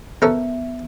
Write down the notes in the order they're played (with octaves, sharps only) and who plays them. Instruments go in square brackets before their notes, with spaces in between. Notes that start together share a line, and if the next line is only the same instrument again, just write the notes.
[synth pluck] B3 E5 [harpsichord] C#4 A4 A#4